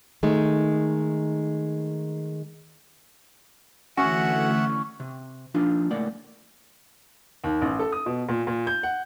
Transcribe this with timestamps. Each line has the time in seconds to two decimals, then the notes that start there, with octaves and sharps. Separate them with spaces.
0.23 D#3 G#3 A3 D#4
3.97 D3 E3 A3 C#4 F#4 E5 F#5
5.00 C3
5.54 F3 D4 D#4 F4
5.91 C#2 A2 A#3 D5 F#5
7.44 D#2
7.61 A1
7.79 A4
7.92 D#6
8.06 B2
8.29 A#2
8.47 A#2
8.67 G6
8.83 F#5